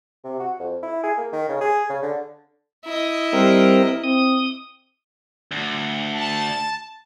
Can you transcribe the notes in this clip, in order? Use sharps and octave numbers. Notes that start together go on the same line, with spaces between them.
C3
F#4
F2
E4
G#4
A#3
D#3
C#3
G#4
C#3
D3
E4 D#5
G3 C4 A#4
C4 D#6
D2
A5